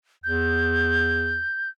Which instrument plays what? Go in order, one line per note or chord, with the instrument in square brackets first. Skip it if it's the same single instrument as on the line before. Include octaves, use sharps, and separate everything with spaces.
[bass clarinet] E2 [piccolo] G6